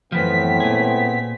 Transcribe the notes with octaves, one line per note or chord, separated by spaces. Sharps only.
F#2 A2 E3 F3 B3 C4 B6
A#2 G#4